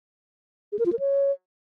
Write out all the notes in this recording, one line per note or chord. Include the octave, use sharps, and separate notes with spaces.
G#4
A#4
F4
A#4
C#5